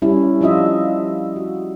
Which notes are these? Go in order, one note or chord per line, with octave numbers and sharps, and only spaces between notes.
G3 C#4 E4
F3 D4 F4 D#5 E5
F#4